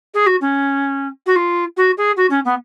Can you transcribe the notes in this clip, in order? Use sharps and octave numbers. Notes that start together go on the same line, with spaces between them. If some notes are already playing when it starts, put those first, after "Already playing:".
G#4
F#4
C#4
F#4
F4
F#4
G#4
F#4
C#4
B3